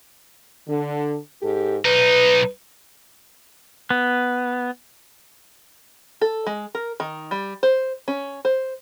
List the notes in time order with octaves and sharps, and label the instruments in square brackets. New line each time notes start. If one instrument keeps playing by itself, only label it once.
[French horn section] D3
G#2 G4 A4
[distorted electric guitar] B1 D#4 [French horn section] B4
[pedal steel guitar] B3
[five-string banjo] A4
G#3
A#4
D#3
G3
C5
C#4
C5